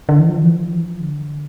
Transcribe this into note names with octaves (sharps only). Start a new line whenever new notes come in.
D3
E3
F3
E3
F3
E3
F3
D3